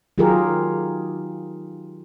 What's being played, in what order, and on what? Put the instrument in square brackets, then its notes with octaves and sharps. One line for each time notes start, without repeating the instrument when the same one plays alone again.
[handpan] D#3 F#3 F4 G4 G#4 A#4